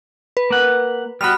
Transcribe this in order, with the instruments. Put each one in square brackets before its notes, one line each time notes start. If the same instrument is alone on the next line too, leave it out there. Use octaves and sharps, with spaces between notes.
[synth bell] B4
[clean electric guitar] A#3 F#5
[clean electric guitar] G3 B3 F#4 [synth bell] B5 F6